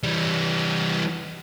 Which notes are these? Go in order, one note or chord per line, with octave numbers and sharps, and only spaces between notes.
E3 G3